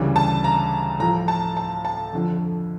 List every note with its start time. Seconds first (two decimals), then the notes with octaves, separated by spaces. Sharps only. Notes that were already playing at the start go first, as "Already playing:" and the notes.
Already playing: D2 C#3 E3 G3
0.16 A5
0.44 A#5
1.00 A2 F3 A#5
1.28 A5
1.57 A5
1.85 A5
2.13 F2 D3 F3